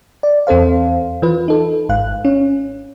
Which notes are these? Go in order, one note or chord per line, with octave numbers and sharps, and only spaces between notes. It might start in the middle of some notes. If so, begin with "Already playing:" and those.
D5
E2 C4 A4 C5 F5
E3 F4 B4
D#4 A4
G#1 G#2 F5 F#6
C#4